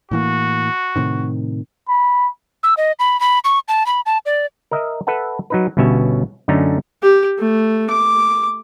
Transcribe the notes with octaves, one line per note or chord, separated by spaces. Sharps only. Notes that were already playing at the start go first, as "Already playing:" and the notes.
A2 E3 A#3 F#4
A2 C3 D#3
B5
E6
D#5
B5
B5
C#6
A5
B5
A5
D5
A#4 D#5 E5
A4 B4 E5 F#5 A5
F#3 D#4 B4
G1 G2 B2 C#4 C#5 E5
F#2 D3 A3 C#4 D#4 A#5
G4
A3
D6